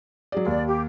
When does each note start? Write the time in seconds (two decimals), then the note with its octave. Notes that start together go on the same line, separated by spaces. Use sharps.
0.32 F#3 G#4 D5
0.46 D#2 D5
0.67 G4